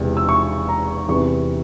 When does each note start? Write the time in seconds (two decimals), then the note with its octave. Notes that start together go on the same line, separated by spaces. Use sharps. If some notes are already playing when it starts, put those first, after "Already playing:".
Already playing: E1 E2 C3 E3
0.17 E6
0.29 C#6
0.69 A#5
1.08 E2 C3 E3 C#6